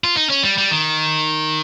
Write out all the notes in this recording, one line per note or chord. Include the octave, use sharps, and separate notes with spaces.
F4
D#4
C#4
G3
G3
D#3